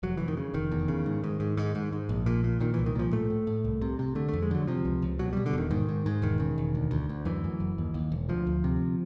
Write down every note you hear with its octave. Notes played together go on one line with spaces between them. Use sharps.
F1 F#3
F1 E3
D#3
C#3
F1 D#3
E2
C#3
G#2
G#2
G#2
G#2
G#2
G#2
A#1
A#2
A#2
A#2 D#3
E3
C2
D#3
A#2 F3
A2 A3
A2
A2
C2
C3
C3
D3 A3
A3
F2
G#3
D3 F#3
C3 F3
C#2
C#2
B2 F#3
B2 G3
D3
E1 D#3
G#2 D#3
G#2
G#2
E1 D#3
C#3
E1
D2
D2
D2
F#2 E3
F#2
F#1
D#2
D#2
E1
D2 F3
D2
C3